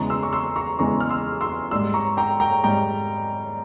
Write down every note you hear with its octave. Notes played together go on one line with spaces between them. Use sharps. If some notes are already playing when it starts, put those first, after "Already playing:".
Already playing: E2 C#3 E3 G#3 A#5 C#6
C6 E6
C#6
C6 E6
A#5 C#6
E2 C#3 E3 G#3 A#5 C#6
F6
C6 E6
C6 E6
G#2 G3 C6 E6
A#5 C#6
G5 A#5
G5 A#5
G#2 G3 G5 A#5